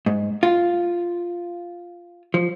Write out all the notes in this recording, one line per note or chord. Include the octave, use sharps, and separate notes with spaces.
G#2
F4
F3